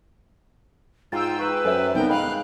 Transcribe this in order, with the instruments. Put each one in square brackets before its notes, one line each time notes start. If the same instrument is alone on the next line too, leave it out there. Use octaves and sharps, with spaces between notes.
[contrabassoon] G#2 [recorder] F4 [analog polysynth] G5 E6 [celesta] A6
[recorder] B4 [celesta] A#5 C#6
[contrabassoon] F#2 [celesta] A4 C5 E5
[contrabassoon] C2 [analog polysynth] B3 A#4 [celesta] D#4 [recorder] G5
[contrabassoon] G#2 [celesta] D#5 G5 B5 [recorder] F5 [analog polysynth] F#6